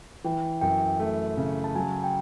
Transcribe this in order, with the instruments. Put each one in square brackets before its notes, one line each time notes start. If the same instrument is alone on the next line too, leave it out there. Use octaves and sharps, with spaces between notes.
[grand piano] E3 [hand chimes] G5
[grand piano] F#2 [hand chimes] G5
[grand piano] A3
C#3
[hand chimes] A5
[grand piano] F#3 [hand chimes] G#5
[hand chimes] G5